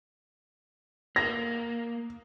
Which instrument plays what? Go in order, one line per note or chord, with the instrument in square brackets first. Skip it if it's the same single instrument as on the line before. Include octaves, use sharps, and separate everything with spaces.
[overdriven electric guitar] A#3 [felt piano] A#6